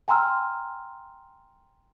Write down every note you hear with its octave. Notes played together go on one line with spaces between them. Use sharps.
G5 G#5 A#5 C6 E6 F6